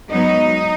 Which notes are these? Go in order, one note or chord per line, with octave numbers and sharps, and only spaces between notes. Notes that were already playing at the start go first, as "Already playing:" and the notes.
G#2 F#3 B3 D#4